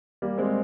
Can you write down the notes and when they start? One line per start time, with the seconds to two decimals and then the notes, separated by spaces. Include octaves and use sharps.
0.22 G3 A#3
0.38 G#3 C4